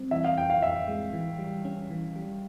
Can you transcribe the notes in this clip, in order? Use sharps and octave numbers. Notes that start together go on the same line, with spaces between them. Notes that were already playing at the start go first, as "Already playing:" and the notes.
Already playing: G3 C4
E3 E5
F5
F2 G5
F5
F2 E5
G#3
E3
G3
C#4
E3
G3